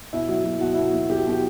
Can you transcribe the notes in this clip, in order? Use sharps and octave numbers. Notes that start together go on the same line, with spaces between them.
B2 E4
F#3
F#3
B2 F#4
B2 E4
F#4
F#3
F#3 G4
B2 G4